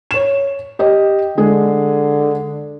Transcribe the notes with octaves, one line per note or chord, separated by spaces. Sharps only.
C#5 E7
G4 D#5
D3 G#3 G#4